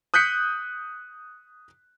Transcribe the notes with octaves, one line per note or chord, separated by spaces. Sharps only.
D#6 F#6 G6 B6 C#7